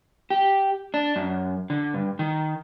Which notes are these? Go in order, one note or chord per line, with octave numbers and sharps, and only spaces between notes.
G4
D4
F#2
D3
G2
D#3